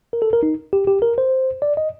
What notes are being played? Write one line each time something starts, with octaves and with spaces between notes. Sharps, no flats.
A#4
A4
A#4
D#4
G4
G4
A#4
C5
D5
D#5